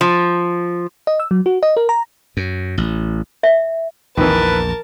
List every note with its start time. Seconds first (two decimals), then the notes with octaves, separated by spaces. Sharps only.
0.01 F3
1.07 D#5
1.20 E6
1.31 F#3
1.46 F#4
1.63 D#5
1.77 A#4
1.89 A#5
2.37 F#2
2.78 A1
3.43 E5
4.17 A#1 E2 D#3 E3 A#4 B4 A5